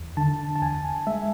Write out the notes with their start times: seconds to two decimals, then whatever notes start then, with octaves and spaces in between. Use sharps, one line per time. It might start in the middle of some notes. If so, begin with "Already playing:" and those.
Already playing: E2
0.17 D3 A5
0.56 A5
0.62 E2 G#5
1.07 G#3 E5